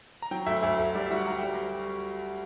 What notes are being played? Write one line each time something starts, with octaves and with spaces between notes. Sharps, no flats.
A#5
F#3 G5
D2 E5
D2 E5
D2
G3 D5
F#4 E5
F#5
G3 A#5
G5
G3